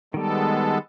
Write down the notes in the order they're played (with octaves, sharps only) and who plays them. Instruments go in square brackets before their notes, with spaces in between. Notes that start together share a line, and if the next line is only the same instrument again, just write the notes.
[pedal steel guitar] D#3 G3 [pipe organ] G#3 B3 A4